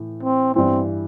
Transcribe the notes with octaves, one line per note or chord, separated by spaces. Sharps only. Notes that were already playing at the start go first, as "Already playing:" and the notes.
Already playing: A2 E3
C4
G2 E3 B3 C4